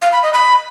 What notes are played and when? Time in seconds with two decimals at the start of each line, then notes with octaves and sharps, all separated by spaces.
0.02 F5
0.12 B5
0.23 D#5
0.33 B5